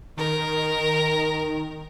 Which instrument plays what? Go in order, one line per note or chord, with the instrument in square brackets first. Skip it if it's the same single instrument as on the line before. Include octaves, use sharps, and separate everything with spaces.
[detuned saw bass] D#3 [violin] A#4